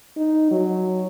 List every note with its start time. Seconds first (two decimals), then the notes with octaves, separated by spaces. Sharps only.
0.17 D#4
0.51 F#3